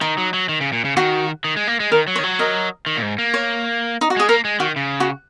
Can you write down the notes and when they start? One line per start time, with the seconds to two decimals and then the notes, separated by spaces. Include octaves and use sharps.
0.01 D#3 D#4
0.18 F#3
0.34 F#3
0.49 D#3
0.61 C#3
0.73 A#2
0.85 C#3
0.97 D#3 F#4
1.44 D#3
1.56 G#3
1.67 A#3
1.80 G#3
1.91 D#3 A#4
2.08 F#3
2.16 C#5
2.19 D#3
2.23 F#3
2.39 A#4 D#5
2.86 D#3
2.97 A#2
3.02 G#2
3.19 A#3
3.34 C#5
4.01 D#4
4.10 F#4
4.17 G#3 G#4
4.29 A#3 A#4
4.45 G#3
4.60 D#3 F#4
4.76 C#3
5.00 F#4